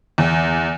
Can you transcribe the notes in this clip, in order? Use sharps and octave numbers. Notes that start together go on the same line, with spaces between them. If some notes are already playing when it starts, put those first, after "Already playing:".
E2